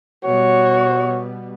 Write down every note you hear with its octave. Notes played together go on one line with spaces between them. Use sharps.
B2 G3 B3 F#4 C#5